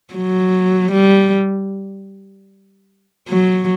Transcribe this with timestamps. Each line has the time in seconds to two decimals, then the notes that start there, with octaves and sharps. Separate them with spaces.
0.14 F#3
0.92 G3
3.29 F#3